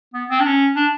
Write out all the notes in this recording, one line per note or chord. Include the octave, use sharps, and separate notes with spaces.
B3
C4
D4
C#4
D4